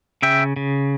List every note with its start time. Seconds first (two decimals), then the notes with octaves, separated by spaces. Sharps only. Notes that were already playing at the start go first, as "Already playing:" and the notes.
0.22 C#3 E5 G5
0.56 C#3